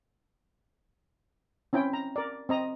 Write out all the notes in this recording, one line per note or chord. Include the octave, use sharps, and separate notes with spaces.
C4 C#4 E4 G5
A#5
A#4 D5
C4 D#5 A#5